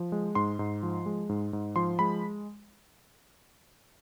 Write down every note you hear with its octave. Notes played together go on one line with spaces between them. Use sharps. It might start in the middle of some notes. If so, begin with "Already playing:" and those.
Already playing: F3
G#3
G#2 C6
G#2
F3
G#3
G#2
G#2
F3 C6
G#3 B5